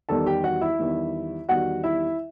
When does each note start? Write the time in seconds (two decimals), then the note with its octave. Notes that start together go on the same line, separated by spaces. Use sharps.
0.09 E2 D#3 G3 A4 A5
0.26 G4 G5
0.44 F#4 F#5
0.61 E4 E5
0.79 E2 D#3 G3
1.49 E2 D#3 G3 F#4 F#5
1.84 E4 E5